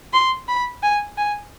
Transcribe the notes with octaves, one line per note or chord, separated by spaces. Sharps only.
C6
B5
G#5
G#5